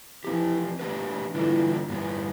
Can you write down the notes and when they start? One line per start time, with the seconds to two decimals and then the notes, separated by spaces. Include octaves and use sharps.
0.24 E3 F3 C4 G4
0.79 E3 A3 D4 G4 B4
1.34 D3 E3 G3 D4 F4 A4
1.89 G2 E3 B3